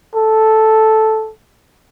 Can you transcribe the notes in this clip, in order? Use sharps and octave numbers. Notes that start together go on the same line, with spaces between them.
A4